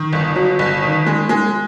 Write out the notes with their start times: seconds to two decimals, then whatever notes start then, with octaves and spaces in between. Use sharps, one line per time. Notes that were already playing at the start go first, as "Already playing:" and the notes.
Already playing: D#3
0.13 G1
0.36 F#3
0.59 G1
0.82 D#3
1.06 G#3
1.29 G#3